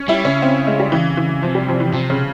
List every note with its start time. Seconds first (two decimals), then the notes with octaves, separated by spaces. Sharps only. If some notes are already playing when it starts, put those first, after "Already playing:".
Already playing: C#4
0.08 G3 E4
0.25 C#3 C#4
0.42 C4
0.67 G#3
0.80 G3
0.92 E3
1.17 E3
1.42 C3 F3
1.55 G3
1.68 F3
1.80 E3
1.93 C3 F3
2.10 C#3